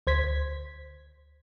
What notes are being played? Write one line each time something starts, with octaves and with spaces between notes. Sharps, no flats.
D2 C5 G#6 B6